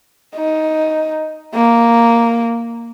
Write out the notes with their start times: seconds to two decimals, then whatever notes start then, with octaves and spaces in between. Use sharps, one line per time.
0.35 D#4
1.55 A#3